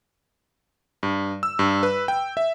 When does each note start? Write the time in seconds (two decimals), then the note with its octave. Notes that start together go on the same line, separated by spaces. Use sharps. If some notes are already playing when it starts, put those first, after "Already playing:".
1.03 G2
1.43 E6
1.59 G2
1.83 B4
2.08 G5
2.37 E5